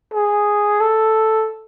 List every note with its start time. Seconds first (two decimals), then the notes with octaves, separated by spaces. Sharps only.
0.14 G#4
0.80 A4